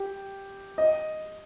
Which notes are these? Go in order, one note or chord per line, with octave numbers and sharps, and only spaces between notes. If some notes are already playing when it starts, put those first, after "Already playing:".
Already playing: G4
D#5